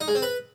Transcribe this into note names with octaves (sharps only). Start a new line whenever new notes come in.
D#4
G#3
C4
B4